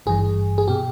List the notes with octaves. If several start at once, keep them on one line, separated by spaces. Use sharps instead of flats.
G#1 G2 E3 G#4
G#4
B2 G4